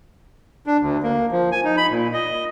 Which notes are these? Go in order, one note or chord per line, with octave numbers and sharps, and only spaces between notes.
D4
D2
A#3
F3
G#5
D#4
B5
A#2
D#5